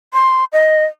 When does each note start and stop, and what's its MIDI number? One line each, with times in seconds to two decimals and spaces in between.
0.13 0.44 84
0.53 0.84 75